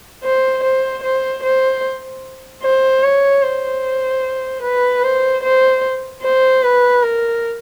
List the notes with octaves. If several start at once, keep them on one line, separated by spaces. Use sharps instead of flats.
C5
C5
C5
C5
C5
C#5
C5
B4
C5
C5
C5
B4
A#4